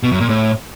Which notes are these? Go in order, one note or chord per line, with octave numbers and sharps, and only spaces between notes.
B2
F#2
A#2
A2